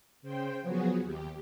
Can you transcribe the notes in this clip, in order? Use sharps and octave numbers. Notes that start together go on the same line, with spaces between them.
C#3 C5 G5
F3 F#3 B3 F#4 G#4
D#2 G4